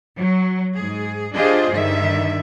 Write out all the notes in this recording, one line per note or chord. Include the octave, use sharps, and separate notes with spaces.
F#3
G#2 G#4
D4 F4 G4 G#4 C5 D#5
G2 D3 D#3 E5